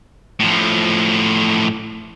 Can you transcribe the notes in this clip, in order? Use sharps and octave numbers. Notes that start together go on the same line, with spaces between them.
A2 F3